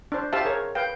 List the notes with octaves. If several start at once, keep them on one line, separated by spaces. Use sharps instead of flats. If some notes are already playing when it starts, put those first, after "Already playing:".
D4 C5
G4 C5 E5 F5 A5
G#4 A#4 C#5
B4 F5 G5